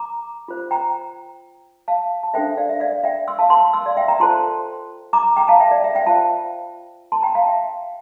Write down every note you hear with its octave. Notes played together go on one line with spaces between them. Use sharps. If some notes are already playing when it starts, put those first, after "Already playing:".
Already playing: A#5 D6
F4 C5
G5 A#5
F5 A5
A5
D4 A4 C5 E5 G5
D5 F5
E5
D5 F5
E5 G5
C6 E6
F5 A5
A5 C6
C6 E6
D5 F5
E5 G5
G5 A#5
F4 A4 C5 A5 C6
A#5 D6
G5 A#5
F5 A5
E5 G5
D5
E5
E5 G5
F4 C5 F5 A5
A5 C6
G5 A#5
F5 A5
E5 G5